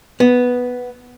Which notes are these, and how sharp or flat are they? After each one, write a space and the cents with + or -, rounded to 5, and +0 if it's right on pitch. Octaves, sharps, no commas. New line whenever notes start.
B3 +0